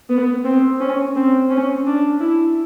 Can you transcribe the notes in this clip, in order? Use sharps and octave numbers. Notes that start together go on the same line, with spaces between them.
B3
C4
C#4
C4
C#4
D4
E4